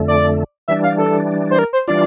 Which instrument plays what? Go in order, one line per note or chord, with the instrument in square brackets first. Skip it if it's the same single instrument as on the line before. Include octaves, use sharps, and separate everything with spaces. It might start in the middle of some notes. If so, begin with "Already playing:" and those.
Already playing: [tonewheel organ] F2 D3 A3
[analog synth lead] D5
[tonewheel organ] E3 G3 D4 [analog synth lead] E5
[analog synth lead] F5
A4
C5
A#4
C5
[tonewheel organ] E3 G3 D4 F4 [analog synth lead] D5